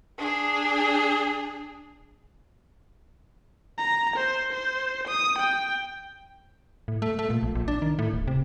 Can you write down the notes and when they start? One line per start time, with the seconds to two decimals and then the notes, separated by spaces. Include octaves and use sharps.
0.18 D4 G#4
3.78 A#5
4.16 C5
4.52 C5
5.07 D#6
5.38 G5
6.88 A2
7.02 A3
7.19 A3
7.30 A#2
7.43 A#1
7.55 A#1
7.68 D4
7.82 D#3
7.99 A2
8.14 D1
8.28 C3